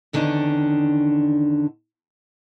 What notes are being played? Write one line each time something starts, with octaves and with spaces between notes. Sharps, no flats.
E2 D3 D#3 B3 C#4 D4